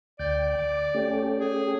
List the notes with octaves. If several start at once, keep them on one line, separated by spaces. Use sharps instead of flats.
D2 D5 G5
D6
A3 C#4 G4
G#4